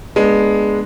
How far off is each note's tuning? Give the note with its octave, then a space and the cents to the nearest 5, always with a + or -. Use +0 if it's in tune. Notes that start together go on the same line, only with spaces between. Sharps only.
G#3 +0 B3 -20 D4 +0